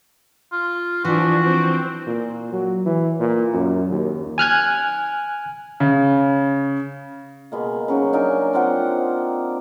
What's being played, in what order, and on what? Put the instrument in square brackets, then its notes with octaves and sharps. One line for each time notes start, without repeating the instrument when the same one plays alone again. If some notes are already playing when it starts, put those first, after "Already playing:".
[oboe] F4
[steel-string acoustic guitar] E3 [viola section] F3 D4 [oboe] F#4
[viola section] C4
[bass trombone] A#2
F#3
E3
A#2
F#2
D#2
[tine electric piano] G#5 F6 F#6 G#6
[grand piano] C#3
[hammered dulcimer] B2 G#3 A#3
C#3 F#3 D#4
D4 D#4 A#4 G#5
C4 F4 F#5 G5